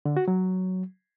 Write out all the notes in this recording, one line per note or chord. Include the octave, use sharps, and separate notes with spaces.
D3
F#4
F#3